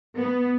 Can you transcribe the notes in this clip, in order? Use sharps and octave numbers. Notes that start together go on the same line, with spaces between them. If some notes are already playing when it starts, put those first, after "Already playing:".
B3